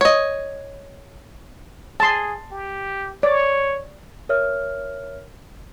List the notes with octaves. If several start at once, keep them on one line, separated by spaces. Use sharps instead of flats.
C#5 D#5
G#4 A5 C6
G4
C#5 D5
A#4 C#5 E5 F6